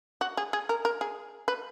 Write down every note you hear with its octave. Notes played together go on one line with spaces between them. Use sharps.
F#4
G#4
G#4
A#4
A#4
G#4
B4